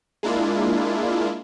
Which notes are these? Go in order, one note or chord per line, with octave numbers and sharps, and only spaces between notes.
G#3 A#3 D4 E4 F4